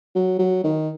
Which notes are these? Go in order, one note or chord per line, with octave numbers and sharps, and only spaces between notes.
F#3
F#3
D#3